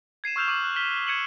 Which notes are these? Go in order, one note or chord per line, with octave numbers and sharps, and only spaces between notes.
G#6 C7 D#7 E7
C#6 E6 F6 G6 E7 F7
C#6 D6 F6 D#7 F#7
F#6
F6 B6 G7
G#6 C#7 D#7 E7 F#7